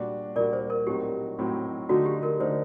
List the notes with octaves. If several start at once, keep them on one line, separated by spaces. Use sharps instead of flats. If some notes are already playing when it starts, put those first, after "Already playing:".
Already playing: A#2 G3 D4 F#4
A#2 G3 D4 F#4 A#4 D5
C5
A#4
A2 F#3 C4 D#4 F#4 G4
A2 F#3 C4 D#4 F#4
D3 A3 D#4 F#4
G4
A#4
D3 A3 D#4 C5